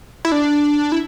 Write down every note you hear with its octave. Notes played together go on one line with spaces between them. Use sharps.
E4
D4
E4